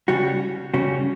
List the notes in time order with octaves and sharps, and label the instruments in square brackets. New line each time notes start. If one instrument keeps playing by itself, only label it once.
[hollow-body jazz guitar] C#3 G3 C#4 F#4
C#3 G3 C#4 F#4